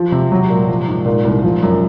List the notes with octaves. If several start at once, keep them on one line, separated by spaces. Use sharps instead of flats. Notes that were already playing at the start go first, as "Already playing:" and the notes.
Already playing: F3
C3
F#3
A#2
F3
G#2
A#2
C2
F3
F#2